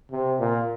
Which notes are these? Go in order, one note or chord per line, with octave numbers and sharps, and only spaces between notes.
C3
A#2